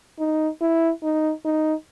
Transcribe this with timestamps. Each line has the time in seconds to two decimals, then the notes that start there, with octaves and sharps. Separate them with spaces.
0.19 D#4
0.61 E4
1.03 D#4
1.45 D#4